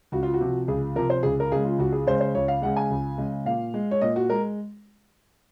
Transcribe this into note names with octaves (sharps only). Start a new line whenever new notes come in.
C#2 F#4
F4
F#4
C3 F3
C#2 G#4
C3 F3 A#4
C5
C#2 G#4
A#4
C#3 G#3 G#4
F4
C#2 F#4
G#4
C#3 G#3 C5
C5
C#2 C#5
F5
C#3 G#3 F#5
G#5
C#2
C#3 G#3
A#2 F5
G#3
C#5
A#2 D#5
F#4
G#3 A#4